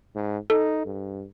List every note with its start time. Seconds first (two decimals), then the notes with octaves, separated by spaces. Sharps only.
0.15 G#2
0.50 D#4 A4
0.85 G2